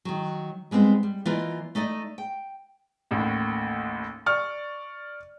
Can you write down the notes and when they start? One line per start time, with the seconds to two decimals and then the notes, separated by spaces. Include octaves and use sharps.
0.05 D#3 F#3
0.71 G3 G#3 B3 C4 E4
1.03 G3
1.26 E3 A#3 F4 D5 D#5
1.75 A3 D#4 D5 D#5
2.18 G5
3.11 A1 D#2 A2
4.26 D5 C#6 F6